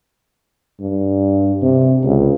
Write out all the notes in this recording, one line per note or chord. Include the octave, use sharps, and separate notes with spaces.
G2
C3
C#2